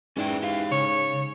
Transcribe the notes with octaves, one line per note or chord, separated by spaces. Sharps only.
G#2 E3 C#4 D5 G5
G4 F5
C#3 C#5